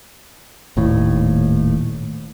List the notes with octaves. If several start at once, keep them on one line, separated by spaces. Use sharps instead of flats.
D#1 D#2 A2